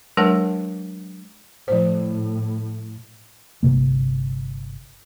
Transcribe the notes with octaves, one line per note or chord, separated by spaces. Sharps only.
F#3 G#3 D4 A#4 B4 F#5
A2 F3 C5
G1 F#2 C3 A#3